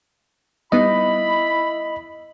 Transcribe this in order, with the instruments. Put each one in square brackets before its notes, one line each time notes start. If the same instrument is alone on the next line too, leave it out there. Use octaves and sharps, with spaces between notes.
[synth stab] G3 B3 D#4 [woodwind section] E4 B5 [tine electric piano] D#5